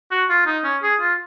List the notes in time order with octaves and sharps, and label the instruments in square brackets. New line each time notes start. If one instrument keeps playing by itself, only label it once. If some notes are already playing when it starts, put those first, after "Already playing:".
[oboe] F#4
F4
D#4
C#4
G#4
F4